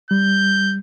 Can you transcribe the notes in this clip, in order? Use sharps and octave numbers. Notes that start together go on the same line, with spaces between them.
G3 G6